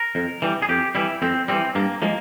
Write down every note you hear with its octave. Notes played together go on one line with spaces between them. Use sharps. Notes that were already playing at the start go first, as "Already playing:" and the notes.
Already playing: A#4
F2
E3 G3
G#4
F2 G4
E3 G3 E4
F2 C4
E3 G3 C4
G2 A#3
F3 G#3 A#3